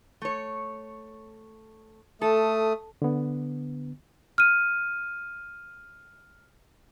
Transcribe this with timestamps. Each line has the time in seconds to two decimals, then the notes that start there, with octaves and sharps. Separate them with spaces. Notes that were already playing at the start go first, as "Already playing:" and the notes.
0.22 A3 C#5
2.22 A3 A4 D#6
3.02 D3 B3
4.38 F6 D#7